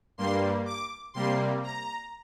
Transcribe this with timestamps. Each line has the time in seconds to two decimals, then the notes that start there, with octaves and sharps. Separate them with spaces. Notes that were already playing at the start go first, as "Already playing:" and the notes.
0.18 G2 G3 A#3 C6
0.66 D6
1.14 C3 G3 A#3 C6
1.63 A#5